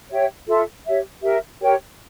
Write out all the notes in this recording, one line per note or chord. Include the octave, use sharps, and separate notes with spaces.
G4 C#5 E5 G5
F4 A4 E5
G4 C#5 E5
G4 A#4 E5
G4 A#4 C#5 G5